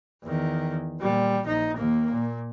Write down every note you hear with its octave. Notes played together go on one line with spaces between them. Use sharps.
E2 D#3
A#2 G3
A#1 D#4
D#2 A#3
A#2